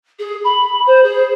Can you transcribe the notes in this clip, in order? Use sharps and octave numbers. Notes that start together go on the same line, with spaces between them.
G#4
B5
C5
G#4